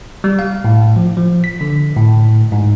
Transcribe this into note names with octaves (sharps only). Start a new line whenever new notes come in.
G3
F5
A2
F3
F3
B6
D3
A2
G#2